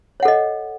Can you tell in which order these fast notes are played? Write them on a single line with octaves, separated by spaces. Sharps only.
C#5 F#5 A4 D#5